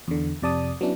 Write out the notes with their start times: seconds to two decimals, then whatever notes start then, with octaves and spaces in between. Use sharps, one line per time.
0.08 E2 D3
0.42 F2 C3 D5 A5 D#6
0.81 F#3 B3 C#4 D4 E4